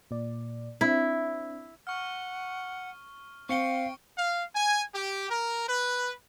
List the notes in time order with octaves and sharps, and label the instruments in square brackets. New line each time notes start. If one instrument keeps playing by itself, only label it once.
[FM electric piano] A#2 D5
[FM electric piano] C4 D4 [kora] E4
[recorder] F#5 [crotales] C#6 F6
[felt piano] C4 [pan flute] F5 [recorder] G5 [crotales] C#6 C#7 G7
[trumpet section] F5
G#5
G4
A#4
B4